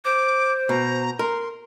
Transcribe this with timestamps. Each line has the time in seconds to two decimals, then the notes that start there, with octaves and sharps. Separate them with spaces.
0.05 C5 D6
0.69 B2 A#5
1.19 A#4 C6